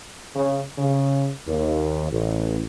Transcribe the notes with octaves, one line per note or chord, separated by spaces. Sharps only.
C#3
C#3
D#2
A1